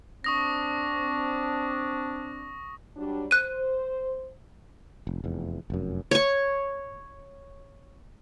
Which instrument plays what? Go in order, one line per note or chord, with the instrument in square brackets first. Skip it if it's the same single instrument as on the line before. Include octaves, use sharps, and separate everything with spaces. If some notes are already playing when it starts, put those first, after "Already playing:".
[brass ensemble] C4 D4 [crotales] C#6 D#6 A#6
[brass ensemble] F#3 G3 D4
[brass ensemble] C5 [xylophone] F#6 D#7
[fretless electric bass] F1
F1 E2
F1 F#2
[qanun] C#5 C#6